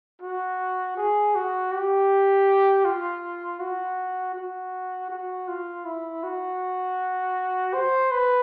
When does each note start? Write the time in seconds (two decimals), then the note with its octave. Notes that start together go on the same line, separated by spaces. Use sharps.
0.21 F#4
0.97 G#4
1.35 F#4
1.71 G4
2.85 F4
3.60 F#4
4.35 F#4
5.10 F#4
5.48 F4
5.85 E4
6.23 F#4
7.73 C5
8.11 B4